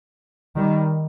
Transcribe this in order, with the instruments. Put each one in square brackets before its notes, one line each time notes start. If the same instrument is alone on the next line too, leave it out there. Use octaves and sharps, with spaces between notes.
[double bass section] D#3 G3